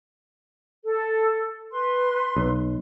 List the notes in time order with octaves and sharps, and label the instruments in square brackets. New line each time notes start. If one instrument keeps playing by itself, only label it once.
[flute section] A4
B4 C6
[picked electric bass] B1